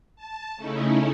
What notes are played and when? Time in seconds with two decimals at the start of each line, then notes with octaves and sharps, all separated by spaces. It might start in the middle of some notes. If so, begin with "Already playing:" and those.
0.16 A5
0.56 C#3 A3 C#4 D#4 E4